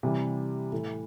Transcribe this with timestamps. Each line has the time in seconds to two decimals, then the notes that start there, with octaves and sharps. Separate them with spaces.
0.03 C3 E3 G3
0.72 A2 E3 A3 E4